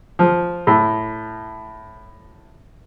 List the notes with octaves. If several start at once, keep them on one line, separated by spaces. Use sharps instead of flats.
F3
A2